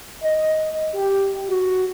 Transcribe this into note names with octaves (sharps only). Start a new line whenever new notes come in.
D#5
G4
F#4